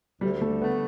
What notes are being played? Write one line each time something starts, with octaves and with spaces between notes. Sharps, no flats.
D2 G3
D3 A3
A3 B3